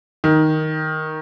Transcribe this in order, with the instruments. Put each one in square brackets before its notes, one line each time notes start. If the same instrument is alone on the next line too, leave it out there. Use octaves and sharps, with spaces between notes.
[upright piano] D#3